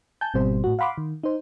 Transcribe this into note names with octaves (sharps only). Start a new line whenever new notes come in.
G#5 A5 G6
G#1 B2 G3 C4 C5
A2 F#4
F5 F#5 B5 C6 D6
D#3
D#4 C5